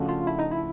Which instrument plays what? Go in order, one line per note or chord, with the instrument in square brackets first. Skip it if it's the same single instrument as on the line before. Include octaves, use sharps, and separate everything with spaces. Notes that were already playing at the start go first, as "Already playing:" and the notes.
Already playing: [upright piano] C#3 F3 A3 D4 F#4
[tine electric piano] F4
E4
D#4
E4